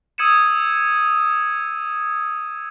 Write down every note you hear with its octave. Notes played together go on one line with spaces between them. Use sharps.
D#6 E6 G#6 C#7 D#7 E7